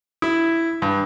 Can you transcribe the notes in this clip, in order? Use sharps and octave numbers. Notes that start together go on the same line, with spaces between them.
E4
G2